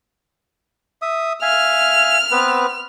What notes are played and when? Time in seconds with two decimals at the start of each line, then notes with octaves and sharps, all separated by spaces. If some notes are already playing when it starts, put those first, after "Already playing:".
1.02 E5 D#6
1.42 E5 F5 G#5 F6
2.31 B3 C4 B4